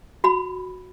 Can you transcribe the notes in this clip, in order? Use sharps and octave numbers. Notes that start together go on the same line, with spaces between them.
F#4 B5